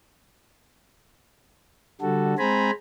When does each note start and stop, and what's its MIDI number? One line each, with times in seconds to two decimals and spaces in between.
2.01 2.34 50
2.01 2.34 55
2.01 2.34 66
2.01 2.34 69
2.38 2.71 56
2.38 2.71 60
2.38 2.71 72
2.38 2.71 80
2.38 2.71 82
2.38 2.71 83